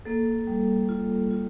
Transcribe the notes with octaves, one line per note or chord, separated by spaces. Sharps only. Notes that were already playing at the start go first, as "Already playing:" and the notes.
A#3 A4
G3
F4
F4